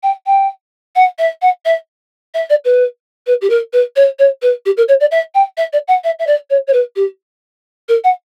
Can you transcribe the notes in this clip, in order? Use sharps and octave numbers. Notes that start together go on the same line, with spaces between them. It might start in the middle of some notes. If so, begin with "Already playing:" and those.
G5
G5
F#5
E5
F#5
E5
E5
D5
B4
B4
G4
A#4
B4
C#5
C#5
B4
G4
A#4
C#5
D5
E5
G5
E5
D5
F#5
E5
E5
D5
C#5
C#5
B4
G4
A#4
F#5